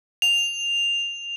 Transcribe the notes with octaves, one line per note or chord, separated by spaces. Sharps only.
F7